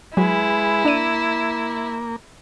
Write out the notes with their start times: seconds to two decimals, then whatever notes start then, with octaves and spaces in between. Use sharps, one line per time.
0.17 F#3 G#3 E4 G#4 B4
0.85 A#3 D4 D5 D#7